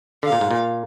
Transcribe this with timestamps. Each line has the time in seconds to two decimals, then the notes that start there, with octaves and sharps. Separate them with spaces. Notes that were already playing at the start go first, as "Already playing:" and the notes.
0.23 D3 F5
0.32 A#2
0.41 G#2
0.51 A#2